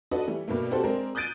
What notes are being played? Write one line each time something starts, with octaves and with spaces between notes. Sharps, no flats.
D4 F#4 A4 B4 D5 D#5
E3 G3 A3
G2 B2 A3 A#3
C4 F#4 G4 A4 C5
G#3 C4 D4 A#4
D#6 F#6 G6 A6 D7 D#7